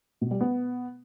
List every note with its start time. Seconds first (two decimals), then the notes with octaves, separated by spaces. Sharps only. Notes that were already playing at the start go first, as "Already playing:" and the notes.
0.21 B2
0.31 G3
0.41 B3